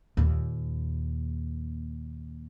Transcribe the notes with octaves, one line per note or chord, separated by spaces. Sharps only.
D#2 A#2